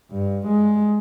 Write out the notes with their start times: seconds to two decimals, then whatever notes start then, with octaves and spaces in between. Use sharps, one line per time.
0.11 G2
0.47 G#3